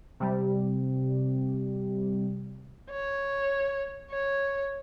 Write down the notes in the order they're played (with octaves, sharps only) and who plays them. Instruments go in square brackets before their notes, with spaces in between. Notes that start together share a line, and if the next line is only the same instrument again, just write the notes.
[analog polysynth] C3 G3
[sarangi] C#5
C#5